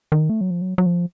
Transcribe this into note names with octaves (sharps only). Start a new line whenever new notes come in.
D#3
A3
F#3
F3
F#3
F#3
F3